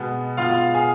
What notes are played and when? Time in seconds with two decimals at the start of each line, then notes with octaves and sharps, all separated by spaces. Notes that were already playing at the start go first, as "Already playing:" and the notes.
Already playing: B2 G#3 B3
0.37 B2 G#3 B3 F4 F5
0.50 F4 F5
0.75 G#4 G#5